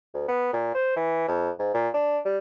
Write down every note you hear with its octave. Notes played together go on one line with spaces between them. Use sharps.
D2
B3
A#2
C5
E3
F2
G#2
A#2
D4
G3